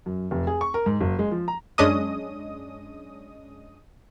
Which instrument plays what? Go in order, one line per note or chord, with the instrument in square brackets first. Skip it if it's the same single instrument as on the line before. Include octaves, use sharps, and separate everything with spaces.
[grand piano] F#2
F1
G#4
C#6
A#4
G#2
F#1
G#3
F3
A#5
[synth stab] F#2 G#3 C#4 D4 D#5 D#6